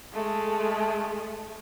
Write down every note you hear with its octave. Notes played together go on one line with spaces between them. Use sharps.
G#3 A3